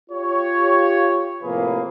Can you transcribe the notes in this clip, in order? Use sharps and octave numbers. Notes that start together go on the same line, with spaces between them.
F4 G4 C#5
A2 C3 F3 A#3 G#4 B4